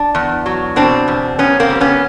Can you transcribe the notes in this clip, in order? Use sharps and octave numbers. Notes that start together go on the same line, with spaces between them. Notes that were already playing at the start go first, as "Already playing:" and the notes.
Already playing: D4
E2
F#3
B2 C4 D4
E2
F#2 B3 C#4
A#3 C4
G3
B3 C#4